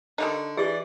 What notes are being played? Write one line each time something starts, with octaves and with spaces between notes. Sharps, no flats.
D3 D#3 G3 D#4
E3 G4 G#4 D5